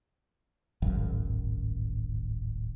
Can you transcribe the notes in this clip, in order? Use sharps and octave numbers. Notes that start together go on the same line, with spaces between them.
D1 G#1 F#2